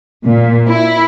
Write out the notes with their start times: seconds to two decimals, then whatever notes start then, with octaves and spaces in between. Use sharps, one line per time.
0.25 A#2
0.67 E4